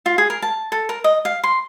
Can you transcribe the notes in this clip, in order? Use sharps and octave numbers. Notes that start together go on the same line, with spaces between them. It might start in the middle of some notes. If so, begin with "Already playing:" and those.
F4
G#4
A#4
A5
A4
A#4
D#5
F5
C6